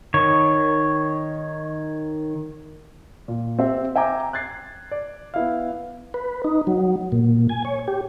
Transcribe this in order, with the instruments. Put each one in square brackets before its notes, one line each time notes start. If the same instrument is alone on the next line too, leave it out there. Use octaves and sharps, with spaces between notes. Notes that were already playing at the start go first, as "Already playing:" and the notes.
[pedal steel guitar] D#3 C#5
[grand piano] A#2
C4 G4 E5
E5 G5 G#5 A#5 D6
F#6 G#6 A6 C7
D5
B3 E4 F5
[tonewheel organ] B4
D#4
F#3
A#2
G#5
C#5
G4